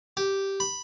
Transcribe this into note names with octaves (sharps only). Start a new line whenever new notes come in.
G4
B5